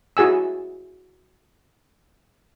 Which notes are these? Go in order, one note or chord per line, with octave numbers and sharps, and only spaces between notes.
E4 F#4 G#4 G#5 E6